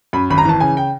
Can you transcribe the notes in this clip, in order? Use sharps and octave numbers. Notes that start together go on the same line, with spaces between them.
F#2 B5
G#1 B5
A#5
E3 A5
C#3 G#5
G5